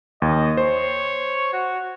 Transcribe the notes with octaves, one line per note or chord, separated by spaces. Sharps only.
D#2 D#5
C5 C#5
F#4